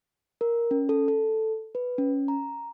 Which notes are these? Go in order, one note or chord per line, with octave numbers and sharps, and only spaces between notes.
A#4
C#4
A4
A4
B4
C#4
A#5